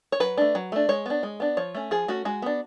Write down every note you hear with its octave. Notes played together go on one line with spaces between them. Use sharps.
C#5
F#3 B4
A3 D4
F#3
A3 D4
G#3 C#5
B3 D4
G#3
B3 D4
F3 C#5
A3 C#4
F3 G#4
A3 C#4 F#4
G#3 F#4
B3 D4